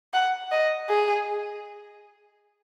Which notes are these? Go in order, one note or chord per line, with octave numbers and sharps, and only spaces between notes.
F#5
D#5
G#4